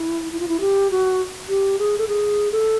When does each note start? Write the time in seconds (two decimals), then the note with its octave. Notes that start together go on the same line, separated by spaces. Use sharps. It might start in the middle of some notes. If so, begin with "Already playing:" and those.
Already playing: E4
0.32 E4
0.40 F4
0.48 E4
0.60 G4
0.91 F#4
1.49 G4
1.79 G#4
1.98 A4
2.08 G#4
2.52 A4